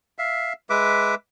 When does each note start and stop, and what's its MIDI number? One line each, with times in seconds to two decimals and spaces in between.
0.18 0.53 76
0.18 0.53 77
0.70 1.15 56
0.70 1.15 71
0.70 1.15 76
0.70 1.15 86